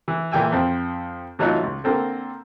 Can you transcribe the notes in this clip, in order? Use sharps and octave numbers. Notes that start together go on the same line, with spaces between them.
E3
A#2 E3 G5 G#5 E6
F2 C4
A2 E3 F#3 D#4 F4
C#2
D3 A#3 C4 A4